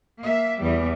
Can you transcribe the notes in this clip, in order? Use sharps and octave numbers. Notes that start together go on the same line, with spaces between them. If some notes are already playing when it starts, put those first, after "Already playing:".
A#3 E5
E2 E3 G3